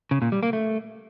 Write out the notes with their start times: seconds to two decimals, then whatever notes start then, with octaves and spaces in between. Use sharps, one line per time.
0.11 C#3
0.22 A#2
0.32 G3
0.43 A#3
0.53 A3